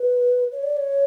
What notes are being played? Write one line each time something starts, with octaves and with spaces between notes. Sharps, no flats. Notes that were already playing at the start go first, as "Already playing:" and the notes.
Already playing: B4
C#5
D5
C#5